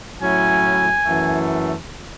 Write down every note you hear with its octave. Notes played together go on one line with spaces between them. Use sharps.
A2 F#3 C#4 E4 G#5
F#2 E3 A3